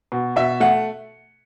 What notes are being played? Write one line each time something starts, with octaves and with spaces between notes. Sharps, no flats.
B2
B2 E5
A3 F#5